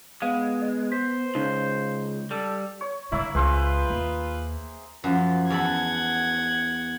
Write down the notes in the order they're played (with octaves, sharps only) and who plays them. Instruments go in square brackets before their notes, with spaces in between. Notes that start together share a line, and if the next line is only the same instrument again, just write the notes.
[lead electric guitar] G#3 [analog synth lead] B3 [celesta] F5
[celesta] D#5
[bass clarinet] C5 [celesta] B6
[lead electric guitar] C#2 [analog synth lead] C#3 [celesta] D#4
[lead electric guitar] G3 [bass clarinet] A4
[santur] C#5
[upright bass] D3 G#3 [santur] A#3 C#5 E5 [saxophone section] E4
[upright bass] C#2 [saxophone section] F4 B4 [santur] G#4 C5 E5
[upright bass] D#2
[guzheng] F#2 [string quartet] F3
[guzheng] E2 A4 B5 [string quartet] F#5 G#6